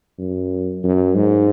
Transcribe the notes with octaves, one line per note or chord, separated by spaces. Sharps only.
F#2
F#2
G#2